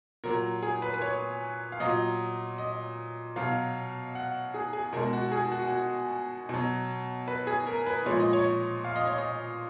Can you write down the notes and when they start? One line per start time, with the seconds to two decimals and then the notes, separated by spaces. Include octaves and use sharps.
0.24 A#2 F#3 A#4
0.62 G#4
0.82 B4
0.94 B4
1.02 C#5
1.72 F5
1.80 A#2 F#3 D#5
2.58 D#5
3.36 B2 F#3 F5
4.15 F#5
4.54 G#4
4.73 G#4
4.93 B2 A#4
4.97 G#3
5.13 F#4
5.32 G#4
5.52 F#4
5.67 F#4
6.49 B2 F#3
7.28 B4
7.47 G#4
7.66 A#4
7.86 B4
8.06 A#2 F3 G#3 C#5
8.20 D#5
8.33 C#5
8.85 F5
8.96 D#5
9.07 C#5
9.18 D#5